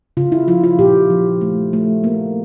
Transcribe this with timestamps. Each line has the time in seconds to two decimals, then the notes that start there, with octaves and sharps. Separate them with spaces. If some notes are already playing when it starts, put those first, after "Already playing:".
0.17 C#3 F4
0.32 E4
0.48 F3 F4
0.64 F4
0.79 A#2 G4
1.10 F3
1.41 A3
1.73 A3
2.04 A#3